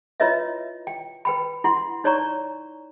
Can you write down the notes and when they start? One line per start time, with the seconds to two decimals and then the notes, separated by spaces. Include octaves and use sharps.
0.20 E4 F4 B4 C#5 D#5 E5
0.87 G5
1.25 B4 G5 B5
1.64 E4 F#5 C6
2.04 D#4 C#5 D5 A#5 C#6